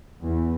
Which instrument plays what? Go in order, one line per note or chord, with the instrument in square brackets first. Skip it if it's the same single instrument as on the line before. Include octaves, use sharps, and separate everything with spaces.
[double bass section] E2